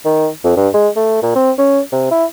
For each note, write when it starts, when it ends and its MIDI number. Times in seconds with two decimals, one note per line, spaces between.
0.05 0.28 51
0.44 0.55 41
0.57 0.68 43
0.74 0.89 56
0.96 1.21 57
1.23 1.35 46
1.36 1.51 60
1.58 1.80 61
1.92 2.11 48
2.11 2.25 64